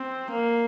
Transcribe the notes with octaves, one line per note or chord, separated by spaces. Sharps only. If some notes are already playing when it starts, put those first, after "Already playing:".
Already playing: C4
A#3